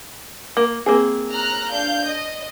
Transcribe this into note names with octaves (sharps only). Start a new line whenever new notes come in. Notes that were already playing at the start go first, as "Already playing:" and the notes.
A#3
A#3 C4 G#4
A#5 F6 F#6
D4 F5 G6
D#5